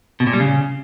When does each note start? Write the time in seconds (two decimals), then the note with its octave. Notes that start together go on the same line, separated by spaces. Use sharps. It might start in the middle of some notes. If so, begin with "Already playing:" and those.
0.20 B2
0.27 A#2
0.33 G3
0.40 C#3